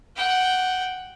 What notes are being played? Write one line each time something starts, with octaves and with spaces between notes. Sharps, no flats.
F#5 G5